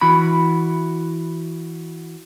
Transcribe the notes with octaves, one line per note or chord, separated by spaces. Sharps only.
E3 E4 F#4 B5